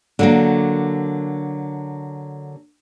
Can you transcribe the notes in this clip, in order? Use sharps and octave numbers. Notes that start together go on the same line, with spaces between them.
D3 F#3 A#3